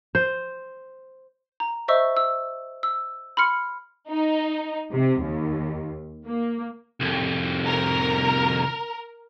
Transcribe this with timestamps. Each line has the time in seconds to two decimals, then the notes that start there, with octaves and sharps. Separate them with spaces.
0.15 C5
1.60 A#5
1.88 C5 D#5 E5 C#6 E6
2.17 E6
2.83 E6
3.37 B5 C6 F6 C#7
4.10 D#4
4.93 C3
5.23 D#2
6.25 A#3
7.00 C2 F2
7.67 A#4